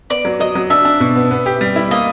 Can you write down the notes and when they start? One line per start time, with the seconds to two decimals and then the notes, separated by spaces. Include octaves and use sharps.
0.10 B3 D5
0.25 F#3
0.40 F#3 D#5
0.55 F#3
0.70 D4 E5
0.85 D4
1.00 B2
1.16 B3
1.31 B3
1.46 G4
1.61 G3
1.76 E4
1.91 A#3 D#5